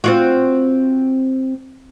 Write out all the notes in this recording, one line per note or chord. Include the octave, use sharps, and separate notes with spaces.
C4 F4 F#4